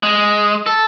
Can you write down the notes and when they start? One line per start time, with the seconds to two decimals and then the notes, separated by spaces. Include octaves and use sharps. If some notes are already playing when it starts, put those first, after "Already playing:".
0.03 G#3
0.66 A4